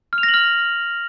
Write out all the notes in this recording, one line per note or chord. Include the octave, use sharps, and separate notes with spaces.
F6
F7
A#6
F#7
F6